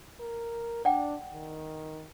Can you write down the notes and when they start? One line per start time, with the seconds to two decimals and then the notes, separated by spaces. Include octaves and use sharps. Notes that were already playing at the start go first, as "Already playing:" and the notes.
0.20 A#4
0.85 D4 D5 F#5 G5
1.32 D#3